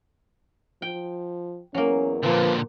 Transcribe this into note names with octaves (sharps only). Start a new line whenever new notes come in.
F3 G5
E2 F#3 A#3 C#4
A#2 D3 F3 B4